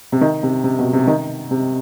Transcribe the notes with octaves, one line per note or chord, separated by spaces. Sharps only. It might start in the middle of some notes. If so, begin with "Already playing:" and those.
C3
D#3
C3
C3
B2
C3
D#3
C3